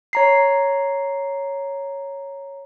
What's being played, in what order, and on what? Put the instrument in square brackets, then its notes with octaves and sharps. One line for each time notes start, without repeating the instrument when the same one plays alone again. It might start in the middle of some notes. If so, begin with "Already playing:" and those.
[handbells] C#5 A#5 C7